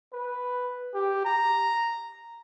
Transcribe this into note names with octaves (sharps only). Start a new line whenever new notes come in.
B4
G4
A#5